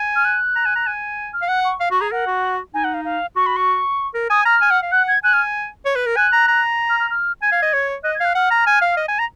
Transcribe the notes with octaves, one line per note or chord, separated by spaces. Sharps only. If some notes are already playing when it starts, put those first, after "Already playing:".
Already playing: G#5
F6
F#6
A#5
G#5
A#5
G#5
F6
F5
F#5 F#6
C#6
F5
F#4 C#6
G#4 A#5
A#4 F#5
F#4
D#4 G#5
F#5
F5
F5
F#4 C#6
B5
C#6
A#4
G#5 D#6
A#5 F6
G#5
F#5
F5
F#5 F#6
G#6
G#5 F#6
F6
C#5
B4
A#4
G#5 F#6
A#5
A#5
F6
F6
F6
G#5 G#6
F5
D#5
C#5
D#5 F#6
G#6
F5 F#6
F#5 F6
A#5
G#5
F5
D#5
G#5
A#5